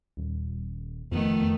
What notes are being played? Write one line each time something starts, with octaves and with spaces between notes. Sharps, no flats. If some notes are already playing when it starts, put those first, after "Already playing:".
D#1
F2 D#3 A3 B3